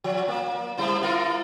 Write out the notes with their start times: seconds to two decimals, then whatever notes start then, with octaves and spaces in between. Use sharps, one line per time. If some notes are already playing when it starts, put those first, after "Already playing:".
0.04 F3
0.28 A#3
0.78 G3 E4 C5
1.03 E4 F4 A#4